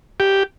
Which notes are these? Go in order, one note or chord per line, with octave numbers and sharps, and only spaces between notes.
G4